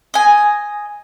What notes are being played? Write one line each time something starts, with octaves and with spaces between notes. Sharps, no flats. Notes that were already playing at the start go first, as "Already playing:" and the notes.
D#5 G#5